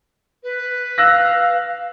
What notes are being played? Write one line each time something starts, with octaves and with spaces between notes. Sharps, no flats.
B4
F5 E6 F#6 A#6